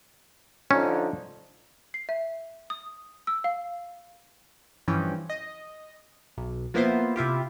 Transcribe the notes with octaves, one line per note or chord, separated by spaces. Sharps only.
D3 F3 C#4 D#4
C7
E5
D#6
E6
F5
G2 E3 F3 C#4 G5
D#5
B1
F3 A#3 B3 E4 F4 C5
C3 E4 F4 G4